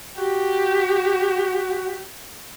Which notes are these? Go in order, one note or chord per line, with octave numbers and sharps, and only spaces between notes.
F#4 G4